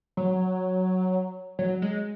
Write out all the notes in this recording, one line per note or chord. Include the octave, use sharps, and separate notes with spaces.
F#3
F#3
G#3